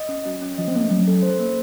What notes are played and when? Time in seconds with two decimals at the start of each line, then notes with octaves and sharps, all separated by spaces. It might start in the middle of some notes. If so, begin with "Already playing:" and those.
Already playing: D#5
0.09 C#4
0.25 F#3 C#4
0.42 C#4
0.58 F3 D#5
0.68 C4
0.74 A#3 C#4
0.83 A3
0.90 F#3 C#4
1.08 A4
1.23 C5
1.39 A#3